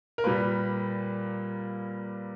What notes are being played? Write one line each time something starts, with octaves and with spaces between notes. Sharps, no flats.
A#4
A#2 G3 A#3 B4